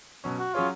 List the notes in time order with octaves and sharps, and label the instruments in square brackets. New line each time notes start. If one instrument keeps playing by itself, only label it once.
[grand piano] B2 F#3 C#4
[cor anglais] F#4
[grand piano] F#3 C#4 G#4 C#5 [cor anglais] F4